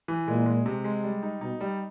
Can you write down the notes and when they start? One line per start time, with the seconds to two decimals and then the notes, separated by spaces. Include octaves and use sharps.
0.08 E3
0.27 A#2 G#3
0.46 G#3
0.66 C3
0.84 G#3
1.04 G3
1.23 D#4
1.41 B2 D#4
1.60 G3